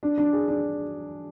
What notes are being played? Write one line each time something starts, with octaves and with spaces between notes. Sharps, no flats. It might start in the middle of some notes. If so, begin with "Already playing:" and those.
D4
D4
G#4
D4